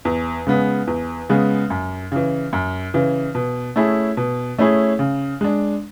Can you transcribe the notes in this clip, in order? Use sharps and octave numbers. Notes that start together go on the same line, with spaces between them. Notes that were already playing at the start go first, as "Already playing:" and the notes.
E2
C#3 G#3 B3
E2
C#3 G#3 B3
F#2
C#3 E3
F#2
C#3 E3
B2
A3 C#4 E4 G#4
B2
A3 C#4 E4 G#4
C#3
G#3 D4